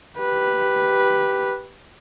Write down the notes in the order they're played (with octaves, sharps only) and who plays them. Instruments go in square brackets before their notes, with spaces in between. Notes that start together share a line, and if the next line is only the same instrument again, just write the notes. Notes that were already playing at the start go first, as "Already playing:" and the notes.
[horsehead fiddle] G4 B4